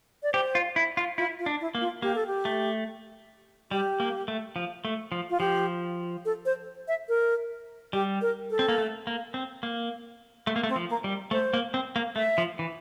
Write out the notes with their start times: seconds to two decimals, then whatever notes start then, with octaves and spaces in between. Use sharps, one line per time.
0.23 D5
0.33 G4 C5
0.55 F4
0.76 E4
0.97 F4
1.18 E4 F4
1.39 F4
1.46 D4
1.61 E4
1.75 A#3
1.81 F4
2.02 A#3 G4
2.15 A4
2.27 G4
2.45 A3
3.71 G3 G4
4.00 A#3
4.28 A3
4.56 F3
4.85 A3
5.12 F3
5.30 F4
5.40 F3 G4
6.25 A4
6.46 C5
6.88 E5
7.09 A#4
7.93 G3 G4
8.22 A#4
8.50 A4
8.59 C4
8.68 A#3
8.78 A3
9.07 A#3
9.34 C4
9.63 A#3
10.47 A3
10.56 A#3
10.63 A3
10.69 C4
10.76 F3
10.89 A#3
11.04 G3
11.31 A3 C5
11.54 A#3
11.74 C4
11.96 A#3
12.16 A3 E5
12.38 F3
12.59 E3